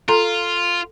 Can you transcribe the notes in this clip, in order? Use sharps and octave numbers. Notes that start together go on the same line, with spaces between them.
F4 A4 A#5 C6